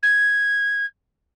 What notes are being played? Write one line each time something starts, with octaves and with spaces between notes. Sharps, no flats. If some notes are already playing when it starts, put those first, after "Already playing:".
G#6